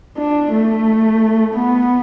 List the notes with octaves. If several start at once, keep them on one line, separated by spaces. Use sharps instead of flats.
D4
A3
B3